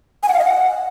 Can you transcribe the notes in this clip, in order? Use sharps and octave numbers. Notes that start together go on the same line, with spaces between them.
G#5
F#5
F5
D#5
F#5